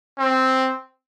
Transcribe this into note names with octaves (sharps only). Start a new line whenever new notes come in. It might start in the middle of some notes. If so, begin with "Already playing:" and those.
C4